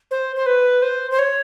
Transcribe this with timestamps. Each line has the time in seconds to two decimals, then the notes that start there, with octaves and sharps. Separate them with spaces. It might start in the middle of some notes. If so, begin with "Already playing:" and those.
0.11 C5
0.36 C5
0.46 B4
0.82 C5
1.11 C5
1.19 C#5